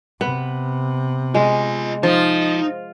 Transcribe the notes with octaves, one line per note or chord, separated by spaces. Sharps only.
C3 B3
G#3 F4 D#5
F3 D#4